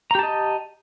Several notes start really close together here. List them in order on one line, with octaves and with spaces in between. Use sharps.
A#5 G4 A5 D#5